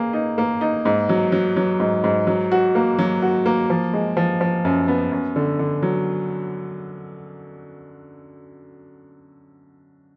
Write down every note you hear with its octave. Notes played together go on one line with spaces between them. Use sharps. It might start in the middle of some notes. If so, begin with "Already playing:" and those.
Already playing: A#3 G#4
D#4
A#3
D#4
G#2
F#3
F#3
F#3
G#2
G#2
F#3
F#4
A#3
F#3
F#4
A#3
F3
G#3
F3
F3
F#2
B3
F#2
D3
D3
F#3